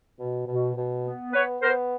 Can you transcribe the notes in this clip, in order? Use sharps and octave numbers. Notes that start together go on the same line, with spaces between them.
B2
B2
B2
B3
B3 B4 C#5
B3 A#4 C5